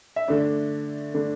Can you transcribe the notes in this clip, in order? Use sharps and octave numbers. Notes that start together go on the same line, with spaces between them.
E5
D3 A3 D4 D5
D3 A3 D4